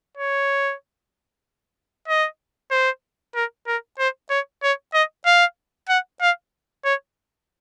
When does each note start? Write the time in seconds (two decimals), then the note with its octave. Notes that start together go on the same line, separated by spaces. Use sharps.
0.17 C#5
2.08 D#5
2.71 C5
3.35 A#4
3.67 A#4
3.99 C5
4.30 C#5
4.63 C#5
4.93 D#5
5.26 F5
5.89 F#5
6.21 F5
6.85 C#5